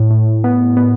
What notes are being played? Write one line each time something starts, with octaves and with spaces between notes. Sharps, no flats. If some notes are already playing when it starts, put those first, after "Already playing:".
Already playing: A2
A2
B3
B3